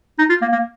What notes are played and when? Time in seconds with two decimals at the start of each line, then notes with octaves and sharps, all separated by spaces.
0.19 D#4
0.30 F4
0.42 A#3
0.52 A#3